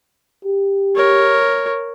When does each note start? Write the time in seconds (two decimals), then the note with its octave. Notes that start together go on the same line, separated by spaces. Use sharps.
0.45 G4
0.95 A#4 C#5